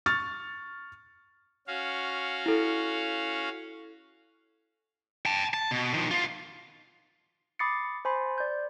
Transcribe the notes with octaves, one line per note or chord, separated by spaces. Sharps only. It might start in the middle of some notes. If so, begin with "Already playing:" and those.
C#6 F6 A6
C#4 F#4 F5
E4 A4
G5 A5
A5
B2
D#3 F3
B3 F4
B5 D6 D#6 A6 C7 C#7
C5 G#5 B5 C6
D5 G6